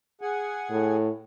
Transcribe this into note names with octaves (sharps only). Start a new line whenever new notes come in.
G#4 F#5 G#5
A2